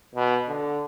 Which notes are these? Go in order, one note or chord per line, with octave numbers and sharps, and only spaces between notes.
B2
D3